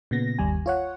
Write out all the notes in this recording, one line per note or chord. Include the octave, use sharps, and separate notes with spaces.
A#2 C#3 B3 A#6
G1 D#2 G3 G#5
F4 C#5 F#5